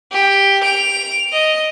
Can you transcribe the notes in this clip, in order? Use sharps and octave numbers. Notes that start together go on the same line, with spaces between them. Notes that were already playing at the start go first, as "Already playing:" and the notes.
G4
D7 F7
D#5